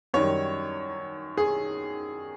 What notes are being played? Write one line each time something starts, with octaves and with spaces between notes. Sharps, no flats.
F#2 D#3 G3 C#5
G#4